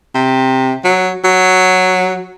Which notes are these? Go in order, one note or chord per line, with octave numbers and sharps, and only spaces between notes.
C3
F#3
F#3